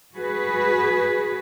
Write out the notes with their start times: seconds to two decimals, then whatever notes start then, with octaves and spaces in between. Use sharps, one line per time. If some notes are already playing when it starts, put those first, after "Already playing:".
0.16 F#4 G#4 B4